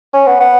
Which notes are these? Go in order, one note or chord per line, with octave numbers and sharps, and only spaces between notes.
C#4
B3
B3